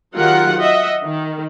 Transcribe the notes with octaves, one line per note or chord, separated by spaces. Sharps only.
D#3 F#3 F4 G4 A#4 F#5
D#5 E5 F#5
D#3